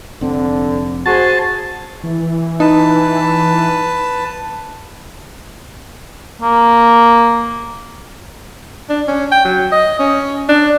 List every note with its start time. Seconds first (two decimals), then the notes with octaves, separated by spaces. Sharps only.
0.21 F1 D3 C4
1.06 F#4 G#4 C5 A5
2.04 E3
2.60 D#4 B4 A5
6.42 A#3
8.90 D4
9.08 C#4
9.32 G5
9.45 F#3
9.72 D#5
9.99 C#4
10.49 D4